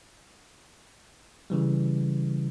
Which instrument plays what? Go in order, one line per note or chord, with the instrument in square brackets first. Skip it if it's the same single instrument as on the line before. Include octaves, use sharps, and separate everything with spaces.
[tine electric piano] C#3 E3 G3